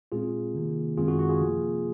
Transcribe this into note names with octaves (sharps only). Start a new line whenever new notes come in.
A#2 G#3 C4 F4 G#4
C3 D#3 A#3
F#2 D#3 G#3 C4 F4 G#4
F#4
F#4
F4 G#4
C3 F3 A#3